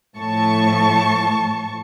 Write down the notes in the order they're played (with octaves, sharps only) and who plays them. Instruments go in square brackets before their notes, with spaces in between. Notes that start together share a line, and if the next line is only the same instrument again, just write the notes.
[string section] A2 F3 A5 C#6